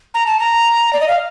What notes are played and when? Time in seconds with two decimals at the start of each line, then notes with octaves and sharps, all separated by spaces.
0.14 A#5
0.27 A5
0.39 A#5
0.93 D5
1.00 D#5
1.08 F5